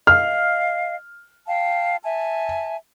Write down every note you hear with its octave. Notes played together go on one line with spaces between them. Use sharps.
D#5 F5 F6
F5 G5 A5
E5 G#5 A5